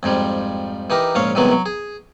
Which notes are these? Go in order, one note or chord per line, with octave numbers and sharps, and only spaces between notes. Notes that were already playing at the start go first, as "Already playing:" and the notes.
F2 G#2 F3 G3
E3 D#4 G4 A#4
A#1 G#2 C#4 C#5 F5
C2 D#3 E3 F#3 G#3 B3
F#3
G#4